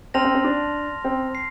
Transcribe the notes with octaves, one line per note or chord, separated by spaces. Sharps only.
C4 A5 C6 F6 A#6 F7
C4
C4
D4
C4
C7